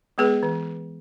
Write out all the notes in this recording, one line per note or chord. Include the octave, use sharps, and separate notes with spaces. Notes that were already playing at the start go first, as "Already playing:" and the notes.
G#3 B3 G#4 B4
E3